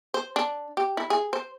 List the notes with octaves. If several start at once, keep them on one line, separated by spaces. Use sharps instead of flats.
C5
D4
G4
E4
G#4
C5